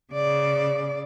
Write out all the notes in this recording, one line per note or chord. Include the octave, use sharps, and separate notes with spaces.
C#3 D5